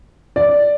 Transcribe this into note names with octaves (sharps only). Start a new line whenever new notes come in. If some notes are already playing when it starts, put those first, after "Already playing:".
D5